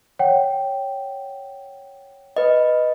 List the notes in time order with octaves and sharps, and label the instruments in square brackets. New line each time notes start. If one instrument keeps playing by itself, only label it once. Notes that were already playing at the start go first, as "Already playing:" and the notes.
[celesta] C#5 F#5 G5
[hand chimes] B4 D#5